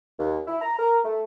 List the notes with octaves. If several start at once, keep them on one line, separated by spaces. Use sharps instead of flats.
D#2
E4
A#5
A#4
A3